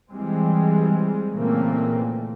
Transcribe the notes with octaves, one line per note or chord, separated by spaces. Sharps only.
E3 G3 G#3 C4
A#2 C#3 E3 A3 A#3 C4